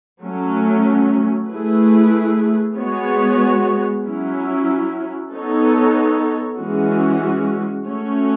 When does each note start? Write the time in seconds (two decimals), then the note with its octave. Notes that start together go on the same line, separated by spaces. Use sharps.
0.22 F#3 A3 C#4
1.50 A3 E4 G#4 B4
2.77 G#3 B3 F#4 C#5
4.04 F#3 C#4 E4
5.31 B3 D#4 A4 C#5
6.57 E3 G#3 C#4 F#4
7.85 A3 C#4 F#4 C#5